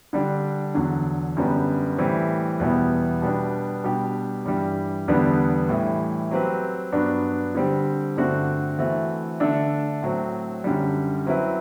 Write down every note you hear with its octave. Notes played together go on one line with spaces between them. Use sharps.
D3 G3 D4
E2 D3 F#3
F#2 D3 G3 B3
A2 E3 G3 C4
E2 B2 G3 B3 E4
B2 G3 B3 D4
B2 G3 D4 G4
G2 E3 G3
E2 D3 G3 B3 D4
A2 E3 G3
F#3 C4 G4 B4
G2 F#3 B3 D4 F#4
D3 G3 C4 G4
G2 D3 A3 C4 F#4
E3 A3 C4 F#4
D3 A3 D4 A4
A2 F#3 C4
F#2 D3 G3
F#3 C4 E4 B4